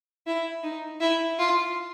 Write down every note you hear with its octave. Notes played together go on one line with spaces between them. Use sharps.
E4
D#4
E4
F4